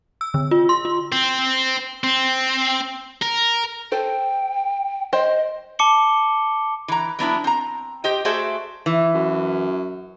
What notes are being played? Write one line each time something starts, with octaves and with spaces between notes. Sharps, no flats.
E6
D3
F4
C6
F4
C4
C4
A#4
A4 C5 G5
C5 D#5 G5
A5 D6 C#7 G7
E3 A#5
F#3 B3 D4 E4
C4 A#5
G4 C5 D#5 G5
A3 F#4 G#4 C5 D5 E5
E3
F#2